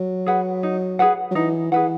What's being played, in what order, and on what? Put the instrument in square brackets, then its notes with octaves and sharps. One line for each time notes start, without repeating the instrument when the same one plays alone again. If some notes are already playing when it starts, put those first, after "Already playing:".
Already playing: [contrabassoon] F#3
[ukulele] G#4 B4 F#5
D#4
G#4 B4 F#5
[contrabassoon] F#3
[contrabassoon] E3 [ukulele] D#4
[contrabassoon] E3 [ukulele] G#4 B4 F#5